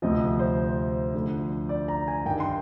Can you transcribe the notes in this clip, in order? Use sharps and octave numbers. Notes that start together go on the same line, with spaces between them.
D2 C3 F3 D#5
C5
D2 D3 F3
D5
A#5
G#5
G2 D#3 G5
C6